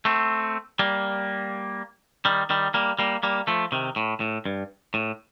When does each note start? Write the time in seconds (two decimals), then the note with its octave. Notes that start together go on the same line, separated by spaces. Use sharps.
0.05 A3 C4
0.79 G3 A#3
2.25 D#3 G3
2.50 D#3 G3
2.74 G3 A#3
2.99 G3 A#3
3.23 G3 A#3
3.47 F3 A3
3.72 C3 D#3
3.96 A2
4.20 A2
4.46 G2
4.94 A2